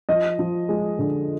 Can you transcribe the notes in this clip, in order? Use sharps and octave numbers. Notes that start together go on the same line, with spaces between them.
F3 D#5
F3
G#3
D3